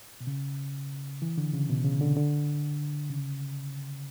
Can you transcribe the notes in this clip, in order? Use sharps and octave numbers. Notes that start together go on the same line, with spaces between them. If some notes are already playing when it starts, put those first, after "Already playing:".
B2
C#3
E3
D3
C#3
B2
C#3
D3
D3
C#3